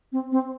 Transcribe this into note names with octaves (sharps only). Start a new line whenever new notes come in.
C4
C4